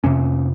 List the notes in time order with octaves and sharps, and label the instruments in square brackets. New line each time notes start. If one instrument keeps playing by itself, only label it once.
[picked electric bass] F2 C3 C#4